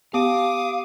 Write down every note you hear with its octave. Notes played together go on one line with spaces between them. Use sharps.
B3 G4 F5 D6 D#6